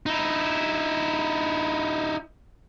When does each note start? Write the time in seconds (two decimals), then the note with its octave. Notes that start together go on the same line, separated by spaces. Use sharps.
0.06 D#4 E4